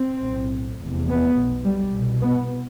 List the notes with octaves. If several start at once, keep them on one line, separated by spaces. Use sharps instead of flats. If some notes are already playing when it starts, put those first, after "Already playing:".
Already playing: C4
B1 A2
F1 E2 C3
B3
B1 B2
G3
C2 B2
B3